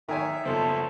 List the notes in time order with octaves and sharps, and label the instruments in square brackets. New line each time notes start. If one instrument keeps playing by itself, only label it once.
[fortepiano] D#3 G#5 [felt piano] A#4 C#5 [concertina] E5
[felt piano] F#1 F3 [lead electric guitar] B2 A4 [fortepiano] C5